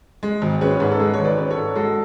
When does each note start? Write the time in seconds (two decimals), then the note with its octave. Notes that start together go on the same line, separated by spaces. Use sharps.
0.23 G#3
0.42 G#1
0.61 C#4 G#4 B4
0.80 G#2 G#4
0.91 A4
1.00 G#3 B4
1.14 C#5
1.19 G#1
1.25 B4 D5
1.38 C#4
1.51 A4 C#5
1.57 G#2
1.76 G#3 F#4 A4